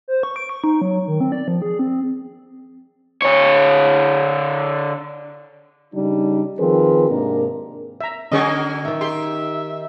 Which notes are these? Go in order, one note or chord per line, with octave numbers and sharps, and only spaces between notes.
C5
C#6
D7
C#6
D#4
F#3
D#3
C4
D5
F3
G#4
C4
D3 C#5
C#3 G3 D4 D#4
D#3 F3 C4 G#4 A#4 B4
G#2 C3 A#3 D4 D#4 A#4
E5 A#5
D3 F#3 A#3 C#4 G#4 D#5 C#6
D#3 D#4 E5
G4 C6